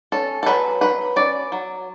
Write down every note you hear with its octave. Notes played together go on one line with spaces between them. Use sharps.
C#4 A4
A4
F#3 B4
F#3 B4
C#4 D5
F#3